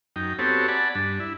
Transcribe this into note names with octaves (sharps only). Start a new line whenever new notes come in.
F#2 D#4 G5
B3 C4 F#4 G4 A4 C#5
D5 F#5 G#5 A5 B5
G2 D4
E4